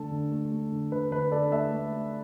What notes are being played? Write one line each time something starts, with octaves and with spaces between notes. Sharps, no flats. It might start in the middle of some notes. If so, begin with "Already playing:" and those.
Already playing: D3 A3 A4
D3
A3
A3
D3
D3 B4
D3 B4
D3 A4 D5
A3 E5 A5
A3
A3